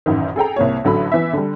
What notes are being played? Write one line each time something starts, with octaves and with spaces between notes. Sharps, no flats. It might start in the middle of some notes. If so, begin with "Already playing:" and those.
A1 F#2 D#3
G#4 A4 G5 A#5
C2 A#3 C#5
A1 D3 F#3 A4 B5
E3 B3 E5
D3 G3